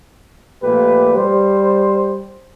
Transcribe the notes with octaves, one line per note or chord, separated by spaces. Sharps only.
A#2 F3 A3 G4 B4
G3 C5